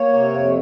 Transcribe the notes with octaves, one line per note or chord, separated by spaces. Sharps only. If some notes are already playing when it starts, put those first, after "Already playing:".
Already playing: A#3 C#5
C3
F2